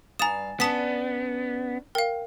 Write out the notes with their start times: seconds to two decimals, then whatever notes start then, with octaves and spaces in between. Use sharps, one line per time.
0.19 G2 F5 G#5 A#5 D#6 A6 E7
0.60 B3 C#4 D4 A5 D#6 B6
1.95 A#4 F5 G5